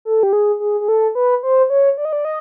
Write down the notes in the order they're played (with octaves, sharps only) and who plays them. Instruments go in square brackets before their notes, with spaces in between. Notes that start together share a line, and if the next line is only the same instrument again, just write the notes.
[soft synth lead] A4
G4
G#4
G#4
G#4
A4
B4
C5
C#5
D5
D#5
D5
D#5